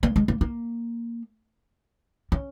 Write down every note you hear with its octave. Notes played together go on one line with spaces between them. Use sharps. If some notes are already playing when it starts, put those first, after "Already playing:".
A#3
G#3
A#3
A#3
C#4